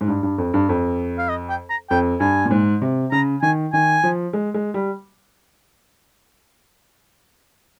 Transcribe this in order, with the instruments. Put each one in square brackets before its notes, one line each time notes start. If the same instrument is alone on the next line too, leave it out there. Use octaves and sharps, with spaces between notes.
[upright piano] G#2
G2
G2
F2
G2
F2
[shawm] F5
D#5
G5
A#5
[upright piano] F2 [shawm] G5
[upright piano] G2 [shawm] G#5
[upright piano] A#2
G#2
C3
[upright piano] C#3 [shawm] A#5
[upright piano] D#3 [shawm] G#5
[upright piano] D#3 [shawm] G#5
[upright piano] F3
G#3
G#3
G3